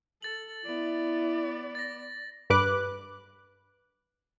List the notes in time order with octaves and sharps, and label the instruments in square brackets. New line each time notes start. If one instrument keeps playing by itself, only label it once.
[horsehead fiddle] A4 [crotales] A6 F#7
[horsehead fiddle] B3 D5 [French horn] E4
[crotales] A6 A#6
[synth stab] G2 B4 D6 F#6